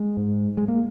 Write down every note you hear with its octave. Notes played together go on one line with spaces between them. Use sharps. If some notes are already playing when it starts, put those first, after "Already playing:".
Already playing: G#3
G#2
G#3
A#3